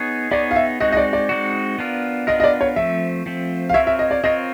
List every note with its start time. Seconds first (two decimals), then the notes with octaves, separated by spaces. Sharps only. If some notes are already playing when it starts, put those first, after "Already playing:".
Already playing: B3 D#4 G#4 C#5
0.31 B3 D#4 G#4 C#5 D5
0.51 F5
0.56 E5
0.80 G#3 C4 D#4 F#4 D#5
0.92 D#5
0.97 D5
1.13 D5
1.29 G#3 C4 D#4 F#4
1.79 B3 D4 F4 A#4
2.27 B3 D4 F4 A#4 D#5
2.40 D#5
2.44 D5
2.61 C#5
2.76 F3 A3 C4 E5
3.26 F3 A3 C4
3.69 F5
3.74 C4 F4 A#4 C#5 E5
3.87 E5
3.99 D#5
4.11 D5
4.24 C4 F4 A#4 C#5 D#5